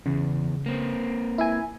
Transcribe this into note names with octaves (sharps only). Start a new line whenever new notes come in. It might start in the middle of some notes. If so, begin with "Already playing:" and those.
E2 C#3
A#3 C4
E4 E5 G#5